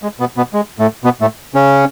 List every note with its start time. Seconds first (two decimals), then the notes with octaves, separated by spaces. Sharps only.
0.03 G#3
0.20 B2 B3
0.37 B2 B3
0.54 G#3
0.79 A2 A3
1.04 B2 B3
1.21 A2 A3
1.54 C#3 C#4